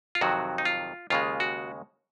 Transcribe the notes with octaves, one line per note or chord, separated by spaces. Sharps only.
F4
F2 C3 D#3 F#3 F#4
D#4
F4
D#2 C#3 G#3 F4
F#4